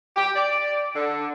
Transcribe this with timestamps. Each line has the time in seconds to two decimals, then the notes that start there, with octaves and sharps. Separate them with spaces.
0.15 G4
0.35 D5
0.94 D3